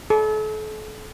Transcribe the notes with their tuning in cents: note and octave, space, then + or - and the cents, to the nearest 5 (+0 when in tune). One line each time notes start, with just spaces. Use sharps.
A4 -40